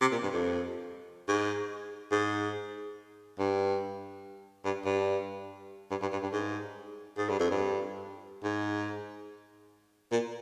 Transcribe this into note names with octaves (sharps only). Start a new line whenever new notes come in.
C3
A#2
G2
F2
G#2
G#2
G2
G2
G2
G2
G2
G2
G2
G#2
G#2
G2
F2
G2
G#2
A#2